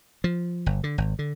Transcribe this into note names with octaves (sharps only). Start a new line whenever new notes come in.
F3
G1
D3
G#1
D3